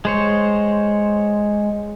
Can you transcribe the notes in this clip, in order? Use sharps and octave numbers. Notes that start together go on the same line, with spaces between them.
G#3 C5 C#5